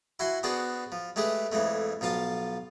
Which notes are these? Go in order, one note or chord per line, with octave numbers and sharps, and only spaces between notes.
E4 F#4 G#5 C6
B3 D4 F#4 G#4 B4 C5
F3
G#3 A3 G4 G#4 B4
F2 E3 G#3 A3
B1 F3 F4 A5